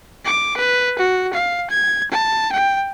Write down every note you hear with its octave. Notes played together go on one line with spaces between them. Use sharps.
D6
B4
F#4
F5
G#6
A5
G5